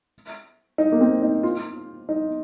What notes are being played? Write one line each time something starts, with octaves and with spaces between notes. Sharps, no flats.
D#4
A#3
C4
D#4
F4
D#4